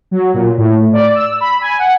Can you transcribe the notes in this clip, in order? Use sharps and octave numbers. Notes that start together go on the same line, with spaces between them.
F#3
A#2
A2
D5
E6
B5
G#5
F#5